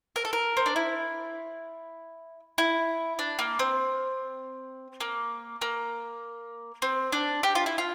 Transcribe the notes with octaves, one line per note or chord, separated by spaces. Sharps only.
A#4
A4
A#4
C4
D4
E4
E4
D4
A#3
C4
A#3
A#3
C4
D4
G4
F4
E4
F4